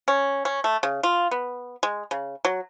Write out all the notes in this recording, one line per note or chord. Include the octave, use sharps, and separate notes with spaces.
C#4
C#4
A3
C#3
F4
B3
G#3
C#3
F#3